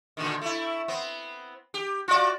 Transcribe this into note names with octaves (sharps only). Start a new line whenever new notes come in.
A#2 D3 D#3
A3 E4
B3 C4
G4
F4 F#4 D5